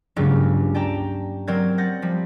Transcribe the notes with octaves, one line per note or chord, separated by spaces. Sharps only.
C#2 G2 C#3 F#3 A#3
D5 G5 A5 A#5
F#3 C4 A#4 D5 G#6
F#5 G6 A6 A#6
F3 G3